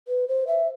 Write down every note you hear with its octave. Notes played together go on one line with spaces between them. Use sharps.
B4
C5
E5